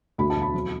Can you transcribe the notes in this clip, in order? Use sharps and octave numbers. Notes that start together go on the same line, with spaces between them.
D2 B5
A5
E1
B5
F#3